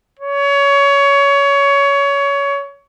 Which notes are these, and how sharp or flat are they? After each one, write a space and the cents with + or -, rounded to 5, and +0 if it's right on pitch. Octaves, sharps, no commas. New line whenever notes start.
C#5 +20